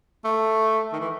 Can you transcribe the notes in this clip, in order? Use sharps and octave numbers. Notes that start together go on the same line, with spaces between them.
A3
D#3
E3